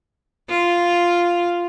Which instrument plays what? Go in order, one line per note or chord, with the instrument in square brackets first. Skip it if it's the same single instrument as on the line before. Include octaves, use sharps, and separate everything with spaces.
[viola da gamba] F4